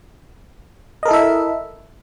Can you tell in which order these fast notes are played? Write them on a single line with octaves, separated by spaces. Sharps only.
D#5 A#4 A4 E4 E5